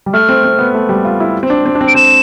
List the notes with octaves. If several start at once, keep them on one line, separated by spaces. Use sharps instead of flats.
G3
A3 F6
C4
C4
B3
A3
G3
F4
E4
C4
D4
C4
D4
C4
D7
C4 E7